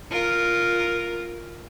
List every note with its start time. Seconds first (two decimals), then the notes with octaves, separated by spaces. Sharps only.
0.11 F4 A#4